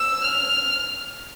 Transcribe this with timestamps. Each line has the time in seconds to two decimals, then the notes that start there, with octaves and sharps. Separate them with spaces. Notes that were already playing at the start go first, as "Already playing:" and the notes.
Already playing: E6
0.24 F6